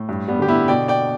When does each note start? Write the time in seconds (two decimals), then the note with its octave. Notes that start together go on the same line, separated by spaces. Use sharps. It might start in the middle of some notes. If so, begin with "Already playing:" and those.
Already playing: A2
0.09 G2
0.28 G3 B3
0.39 D3 G4
0.48 B3 E4
0.68 B2 D5 G5
0.88 D5 G5